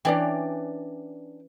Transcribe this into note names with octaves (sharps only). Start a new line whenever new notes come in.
E3 C#4 D4 D5 G5